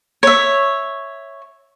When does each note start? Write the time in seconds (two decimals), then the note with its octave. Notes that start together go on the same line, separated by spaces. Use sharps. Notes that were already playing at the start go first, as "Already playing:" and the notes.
0.23 C#5 E5